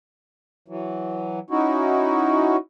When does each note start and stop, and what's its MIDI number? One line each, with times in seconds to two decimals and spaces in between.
0.68 1.39 52
0.68 1.39 54
1.50 2.57 61
1.50 2.57 63
1.50 2.57 64
1.50 2.57 66